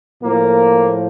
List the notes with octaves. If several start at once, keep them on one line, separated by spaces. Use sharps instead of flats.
A2 F3 A#3